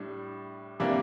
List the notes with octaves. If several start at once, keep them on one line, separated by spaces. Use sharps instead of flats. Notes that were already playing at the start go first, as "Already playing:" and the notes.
Already playing: A2 G3 D4
C3 E3 G3 A#3 D4